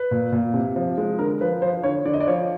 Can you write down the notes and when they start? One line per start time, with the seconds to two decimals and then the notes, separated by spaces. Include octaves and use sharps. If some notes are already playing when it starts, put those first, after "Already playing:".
Already playing: B4
0.11 A#2
0.32 A#2
0.54 C3
0.76 F3
0.98 G#3
1.19 D3 A#4
1.41 F3 B4
1.62 F3 C5
1.83 D3 C#5
2.06 D3 D5
2.13 D#5
2.20 D5
2.27 F3 C#5